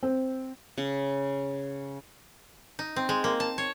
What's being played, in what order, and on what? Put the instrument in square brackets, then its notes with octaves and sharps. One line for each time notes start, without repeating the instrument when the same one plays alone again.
[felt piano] C4
[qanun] C#3
[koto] D#4
C4
G#3
A#3
A5
C#5